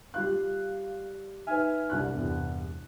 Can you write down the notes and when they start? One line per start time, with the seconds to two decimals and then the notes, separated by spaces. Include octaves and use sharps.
0.14 G3 F4 F5 F#6
1.47 D#4 B4 E5 G#5 F6
1.90 C2 D4 F#6
2.14 E2 G2 C3